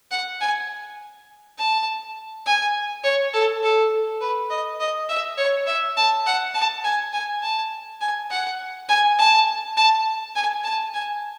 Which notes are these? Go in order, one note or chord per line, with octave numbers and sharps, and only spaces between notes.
F#5
G#5
A5
G#5
C#5
A4
A4
B4
D#5
D#5
E5
C#5
E5
A5
F#5
A5
G#5
G#5
A5
G#5
F#5
G#5
A5
A5
G#5
A5
G#5